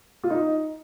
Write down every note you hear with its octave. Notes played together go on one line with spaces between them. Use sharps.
F4
D#4